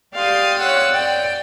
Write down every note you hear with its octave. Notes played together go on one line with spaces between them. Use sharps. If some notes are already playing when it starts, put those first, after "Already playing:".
G4 D5 F5 C6 D#6
C#5 F#5 E6
D5 G5